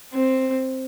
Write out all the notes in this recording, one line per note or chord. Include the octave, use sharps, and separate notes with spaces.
C4